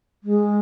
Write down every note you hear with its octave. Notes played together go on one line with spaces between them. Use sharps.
G#3